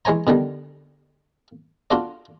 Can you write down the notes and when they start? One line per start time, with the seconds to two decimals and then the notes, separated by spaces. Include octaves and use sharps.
0.05 E3 G#3 C#5 G#5 A#5
0.27 B2 D3 D#3 G3
1.90 D4 F4 F#4 A4 D5